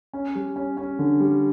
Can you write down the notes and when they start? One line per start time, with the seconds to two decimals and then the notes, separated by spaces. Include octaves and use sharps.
0.13 C#4
0.35 G3
0.56 C#4
0.77 C#4
0.99 D3
1.20 G3